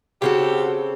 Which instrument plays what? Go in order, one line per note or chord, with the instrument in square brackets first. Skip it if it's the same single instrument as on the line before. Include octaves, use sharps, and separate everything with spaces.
[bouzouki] C#3 C4 A4 [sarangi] F#4 [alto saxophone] G4